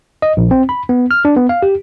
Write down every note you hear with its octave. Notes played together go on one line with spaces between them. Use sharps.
D#5
A#1
C4
B5
B3
F6
D4
B3
F5
G4